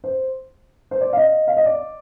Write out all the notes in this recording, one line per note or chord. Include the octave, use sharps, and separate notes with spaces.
C5
C5
D5
F5
D#5
F5
D#5
D5